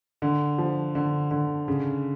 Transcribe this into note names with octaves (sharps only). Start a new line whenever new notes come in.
D3
F3
D3
D3
C#3